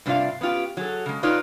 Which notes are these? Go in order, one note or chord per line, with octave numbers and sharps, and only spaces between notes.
G2 C3 D4 F4 D5 F5
B3 C#4 F4 G4
F#3 G#4 A4
C#3 G#3
D#4 F4 A4 B4 C#5 D5